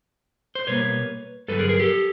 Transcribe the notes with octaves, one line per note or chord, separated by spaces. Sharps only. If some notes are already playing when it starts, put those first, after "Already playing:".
C5
B2 G3 A#3 B4 C#5
G2 D3 F#3 A4 B4
G#4 A#4
G#4 A#4
G4 A4